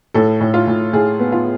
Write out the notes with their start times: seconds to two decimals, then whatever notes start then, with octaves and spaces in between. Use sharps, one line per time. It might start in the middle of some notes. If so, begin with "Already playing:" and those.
0.14 A2 A4
0.41 A2
0.54 F4
0.67 A2
0.93 A2 G#4
1.19 B3
1.32 F4